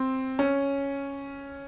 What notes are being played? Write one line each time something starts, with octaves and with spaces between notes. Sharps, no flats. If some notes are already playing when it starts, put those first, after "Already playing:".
Already playing: C4
C#4